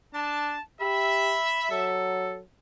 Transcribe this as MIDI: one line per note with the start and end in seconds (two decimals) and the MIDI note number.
0.14 0.55 62
0.14 0.60 81
0.81 1.38 67
0.81 1.89 76
0.81 1.71 83
1.71 2.42 54
1.71 2.38 69